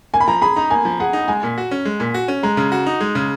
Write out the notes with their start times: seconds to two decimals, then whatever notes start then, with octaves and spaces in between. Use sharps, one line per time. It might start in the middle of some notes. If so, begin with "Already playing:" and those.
0.14 A#3 G#5
0.20 B5
0.28 F3 A#5
0.41 G#4 B5
0.56 D#4 A#5
0.70 A#3 G#5
0.85 F3
1.00 G#4 F#5
1.13 D#4
1.28 G#3 G#5
1.43 A#2
1.58 F#4
1.71 C#4
1.85 G#3
2.00 A#2
2.14 F#4
2.28 C#4
2.43 G#3 A#5
2.57 C#3
2.72 F#4
2.86 D#4
3.00 G#3
3.15 C#3